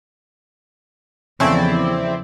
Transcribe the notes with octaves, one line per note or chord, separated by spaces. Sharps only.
E2 C#3 F3 A3 C4 E4 D5